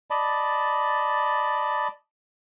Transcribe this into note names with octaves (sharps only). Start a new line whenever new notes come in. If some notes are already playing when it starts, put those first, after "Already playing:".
D5 D#5 A5 B5